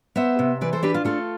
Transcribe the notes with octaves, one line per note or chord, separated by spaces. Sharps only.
B3 C5 E5
C3
E3 B4 D5
A4 C5
D4 G4 B4
F4
A3 F4 A4